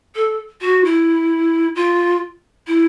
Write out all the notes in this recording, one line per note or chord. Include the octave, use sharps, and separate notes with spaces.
A4
F#4
E4
F4
E4